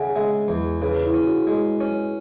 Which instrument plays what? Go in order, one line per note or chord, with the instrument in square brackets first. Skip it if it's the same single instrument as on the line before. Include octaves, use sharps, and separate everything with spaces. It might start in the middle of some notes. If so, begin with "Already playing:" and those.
Already playing: [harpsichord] C#3 [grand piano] E5 F#5 G#5
[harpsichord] G#3 [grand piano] E5
[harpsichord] E2
[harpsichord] C#3 [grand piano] B4
[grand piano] E4
[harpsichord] C#4
[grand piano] F#4
[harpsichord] G#3
C#4